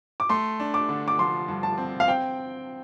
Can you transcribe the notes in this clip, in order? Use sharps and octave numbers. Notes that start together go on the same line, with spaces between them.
D6
A3 C6
D4
D6
D3
D6
F3 C6
G2
A5
C4
F5
C4 G5